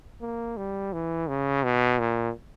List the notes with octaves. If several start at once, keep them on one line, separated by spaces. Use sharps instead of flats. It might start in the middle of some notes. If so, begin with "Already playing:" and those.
A#3
G3
E3
C#3
B2
A#2